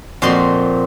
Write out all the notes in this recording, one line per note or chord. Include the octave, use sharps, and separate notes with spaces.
F2 A#2 C4 F#4 C6